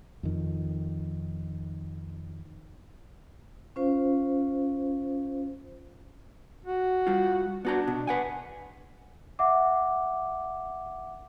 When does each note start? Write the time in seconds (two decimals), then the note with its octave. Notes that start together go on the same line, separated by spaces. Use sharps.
0.23 F2 D#3
3.76 C#4 F4 C5 F5
6.65 F#4
7.07 G3 F4
7.65 B3 D4 F#4 A#5
7.87 B2
8.07 B4 F#5 G#5
9.39 E5 F#5 D6